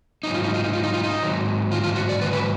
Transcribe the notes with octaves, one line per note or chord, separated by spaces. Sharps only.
G#2 F#3 D#4
F4
D#4
F4
D#4
F4
D#4
F4
D#4
G#2 D#3 F#3
F4
F4
F#4
D5
G#2 D#3 F#3 B4
B4